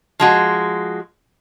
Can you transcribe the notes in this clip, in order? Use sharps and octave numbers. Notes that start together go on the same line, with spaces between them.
F3 G#3 F#4